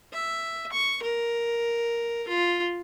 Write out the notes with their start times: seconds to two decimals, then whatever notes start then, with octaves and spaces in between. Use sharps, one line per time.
0.13 E5
0.72 C#6
1.02 A#4
2.28 F4